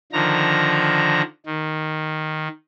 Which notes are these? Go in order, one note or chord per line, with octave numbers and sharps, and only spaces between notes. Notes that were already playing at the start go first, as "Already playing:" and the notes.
D3 D#3 F3 A#5
D#3